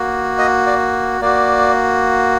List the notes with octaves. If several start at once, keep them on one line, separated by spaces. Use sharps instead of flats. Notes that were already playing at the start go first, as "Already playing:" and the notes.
Already playing: A#3 F#4
D#5
D5
A#3 F#4 D5